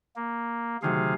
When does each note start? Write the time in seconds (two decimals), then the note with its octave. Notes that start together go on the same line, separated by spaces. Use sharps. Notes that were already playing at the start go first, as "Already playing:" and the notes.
0.16 A#3
0.83 D2 C3 D#3 F#3 G#4 F5